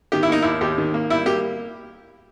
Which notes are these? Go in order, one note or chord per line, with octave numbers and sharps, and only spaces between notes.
D#3 G4
E4
A#3 D#4
D#2 E4
D#2 G4
D#3
A#3
G3 E4
A#3 G4